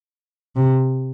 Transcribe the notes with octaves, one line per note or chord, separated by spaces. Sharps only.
C3